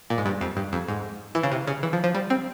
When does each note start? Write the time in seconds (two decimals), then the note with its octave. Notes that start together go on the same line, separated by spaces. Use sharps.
0.10 A#2
0.18 G#2
0.26 G2
0.41 F2
0.57 G2
0.73 F2
0.88 G#2
1.35 E3
1.43 C#3
1.52 C3
1.67 C#3
1.83 E3
1.93 F3
2.04 F3
2.15 G3
2.30 C4